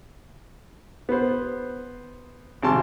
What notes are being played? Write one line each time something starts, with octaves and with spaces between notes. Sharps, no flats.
B3 C5
G#1 C3 A5 C6